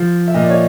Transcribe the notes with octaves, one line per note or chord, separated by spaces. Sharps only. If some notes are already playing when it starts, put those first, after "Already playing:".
Already playing: F3
E5
A#2 D#5
D5
C#5